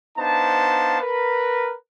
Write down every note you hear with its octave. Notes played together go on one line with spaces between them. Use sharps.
B3 D4 D#4 C5 F5 A5
A#4 B4